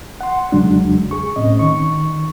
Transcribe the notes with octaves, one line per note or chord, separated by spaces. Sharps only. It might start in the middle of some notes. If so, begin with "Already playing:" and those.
F#5 C6
E2 C#3 F#3 G#3 D4
G#4 C#6
A2 C4 C#4 D#5
D#3 C#6